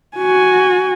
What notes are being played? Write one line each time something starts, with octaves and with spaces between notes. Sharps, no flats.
F#4 G#5